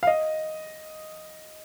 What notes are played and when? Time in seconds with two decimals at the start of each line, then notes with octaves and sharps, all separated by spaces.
0.03 F5
0.07 D#5